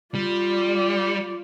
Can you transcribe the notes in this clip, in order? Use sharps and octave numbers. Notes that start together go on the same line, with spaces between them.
G3 F4 D5